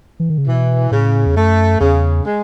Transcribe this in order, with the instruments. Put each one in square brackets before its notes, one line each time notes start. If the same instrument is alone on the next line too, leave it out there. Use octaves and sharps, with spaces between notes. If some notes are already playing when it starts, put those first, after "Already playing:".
[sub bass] E3
D#3
C#3
[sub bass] B2 [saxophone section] E3
[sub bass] A2 [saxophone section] C#3
[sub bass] E2
[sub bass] F#2 [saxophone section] A3
[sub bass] E2 [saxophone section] C#3
[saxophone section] G#3